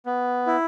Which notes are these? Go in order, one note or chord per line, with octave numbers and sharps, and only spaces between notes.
B3
E4